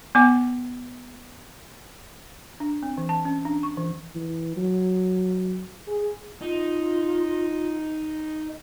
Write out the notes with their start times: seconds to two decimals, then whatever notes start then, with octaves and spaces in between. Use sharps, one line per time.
0.15 B3 G#5 D6
2.60 D4
2.83 C4
2.98 E3
3.09 A5
3.25 C#4
3.45 D4
3.63 C#6
3.78 E3
4.15 E3
4.57 F#3
5.87 G#4
6.42 D#4 F4